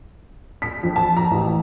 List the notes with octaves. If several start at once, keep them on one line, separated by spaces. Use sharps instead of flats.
B6
F2
A5
A#5
A1